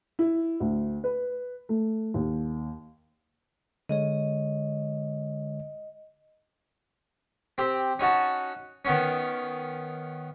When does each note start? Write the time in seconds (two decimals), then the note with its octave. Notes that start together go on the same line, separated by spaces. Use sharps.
0.19 E4
0.60 D2
1.04 B4
1.69 A3
2.14 D#2
3.89 D3 G#3 C#5 D#5
7.58 C4 G4
7.99 C#4 D#4 F#4 A5
8.85 D#3 B3 C#4